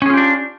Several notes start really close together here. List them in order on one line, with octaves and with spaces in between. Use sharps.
C#4 G#4 F4 G4 D4